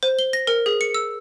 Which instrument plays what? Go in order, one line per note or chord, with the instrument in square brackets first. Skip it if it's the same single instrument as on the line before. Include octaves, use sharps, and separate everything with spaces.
[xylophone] C5
G7
A#6
A#4
G#4
C#7
E6